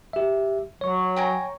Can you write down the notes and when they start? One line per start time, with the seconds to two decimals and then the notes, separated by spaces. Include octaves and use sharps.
0.13 G4 E5
0.81 F#3 C#5 C#6
1.16 G5 G#5 A#5